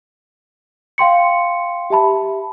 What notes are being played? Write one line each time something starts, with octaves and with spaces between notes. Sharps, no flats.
F5 G5 C6 C#7
G4 E5 A5 B5